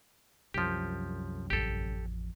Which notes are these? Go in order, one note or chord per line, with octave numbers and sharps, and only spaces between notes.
C2 F#2 F3 G4
A1 F2 G4 A4